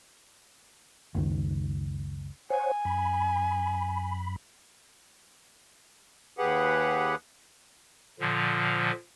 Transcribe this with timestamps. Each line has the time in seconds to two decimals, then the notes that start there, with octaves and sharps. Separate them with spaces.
1.15 F#1 C#2 D#3
2.50 C5 C#5 F#5 G#5
2.85 F#2 B5
6.38 D#2 G4 G#4 B4 F#5
8.20 A#2 D3 F3